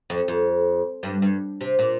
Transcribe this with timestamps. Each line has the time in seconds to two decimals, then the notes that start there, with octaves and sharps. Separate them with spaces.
0.10 F2
0.28 F2
1.03 G2
1.22 G2
1.61 C3
1.79 A#2